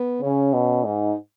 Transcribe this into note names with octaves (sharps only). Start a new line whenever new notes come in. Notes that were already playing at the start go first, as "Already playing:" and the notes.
Already playing: B3
C#3 C#4
B2
G#2 D#4